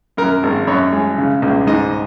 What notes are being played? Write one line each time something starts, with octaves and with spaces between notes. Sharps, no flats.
F#2 A#4
G#1
F#2 C#5
G#3
C#3
C#2
G#2 D#5